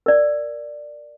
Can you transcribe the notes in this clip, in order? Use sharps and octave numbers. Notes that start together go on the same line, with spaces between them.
A#4 D5